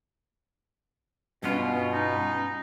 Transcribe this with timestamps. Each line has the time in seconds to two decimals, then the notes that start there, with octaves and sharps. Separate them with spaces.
1.43 G2 B2 B3 C#4 F4
1.93 D#4